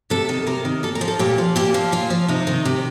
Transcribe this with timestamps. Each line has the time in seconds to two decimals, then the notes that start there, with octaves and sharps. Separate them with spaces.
0.10 C3 A4
0.29 D#3
0.47 C3 A#4
0.65 D#3
0.83 A#2 A4
0.95 A#4
1.01 F3
1.08 A4
1.19 A#2 G4
1.38 F3
1.56 A#2 G4
1.74 F3
1.92 A#2 F4
2.10 F3
2.28 C3 D#4
2.47 D#3
2.65 C3